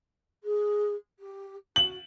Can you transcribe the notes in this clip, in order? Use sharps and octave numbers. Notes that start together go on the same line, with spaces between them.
G#4
G4
F#4 F#7